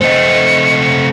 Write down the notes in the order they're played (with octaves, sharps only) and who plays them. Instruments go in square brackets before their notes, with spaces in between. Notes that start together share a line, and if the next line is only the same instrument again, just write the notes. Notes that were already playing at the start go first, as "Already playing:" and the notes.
[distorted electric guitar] A3 C4 [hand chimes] C5 D#5 [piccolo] C#7